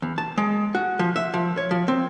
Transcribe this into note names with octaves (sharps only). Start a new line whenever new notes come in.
E2
A5
G#3
F#4
F3
E5
F3
C#5
F3
C4